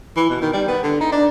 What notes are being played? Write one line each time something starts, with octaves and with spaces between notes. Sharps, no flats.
E3
B2
D#3
G3
B3
D3
D#4
D4